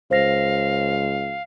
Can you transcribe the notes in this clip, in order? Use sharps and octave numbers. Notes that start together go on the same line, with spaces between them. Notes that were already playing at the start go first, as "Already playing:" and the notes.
C#2 C5 F5 A#6